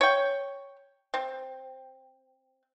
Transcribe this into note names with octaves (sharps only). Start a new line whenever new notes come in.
C#5 G5
C4